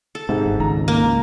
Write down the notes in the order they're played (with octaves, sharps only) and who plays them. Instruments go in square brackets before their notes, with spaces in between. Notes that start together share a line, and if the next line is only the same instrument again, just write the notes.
[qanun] A4
[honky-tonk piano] G#2 [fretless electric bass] C3
[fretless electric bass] G1
[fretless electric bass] G#1 C#2 G#2 [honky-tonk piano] A#5
[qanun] A#3
[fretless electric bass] C#2